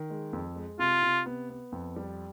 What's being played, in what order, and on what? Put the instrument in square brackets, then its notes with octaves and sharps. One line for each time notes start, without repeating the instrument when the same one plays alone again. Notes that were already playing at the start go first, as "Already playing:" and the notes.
Already playing: [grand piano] D#3
G#3
F2
G#3
[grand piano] C3 [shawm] F4
[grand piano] C3
B3
B3
F2
G3